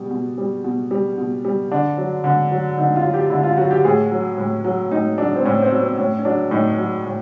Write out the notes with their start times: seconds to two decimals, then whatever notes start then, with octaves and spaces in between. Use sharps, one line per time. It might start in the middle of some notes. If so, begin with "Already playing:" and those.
Already playing: B2 G3
0.11 B2
0.38 G3
0.64 B2
0.91 G3
1.18 B2
1.45 G3
1.71 D3 D4
1.97 F#3
2.24 D3
2.51 F#3
2.78 D3 D#4
2.96 F4
3.04 F#3
3.14 G4
3.30 D3 E4
3.43 F4
3.57 F#3 F#4
3.71 G4
3.85 A2 G#4
4.11 F#3
4.38 A2
4.64 F#3
4.91 A2 D#4
5.18 F#3 D4
5.36 C4
5.45 A2 C#4
5.62 C4
5.71 F#3
5.77 B3
5.81 C4
5.98 A2 C#4
6.19 C#4
6.25 F#3 D4
6.51 A2 D#4
6.78 F#3
7.06 A2